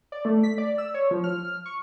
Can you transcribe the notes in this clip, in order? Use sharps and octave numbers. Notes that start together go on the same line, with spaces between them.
D5
A3
B6
D5
E6
C#5
F3
F6
C#6